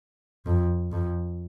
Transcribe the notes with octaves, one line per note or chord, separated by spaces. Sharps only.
F2
F2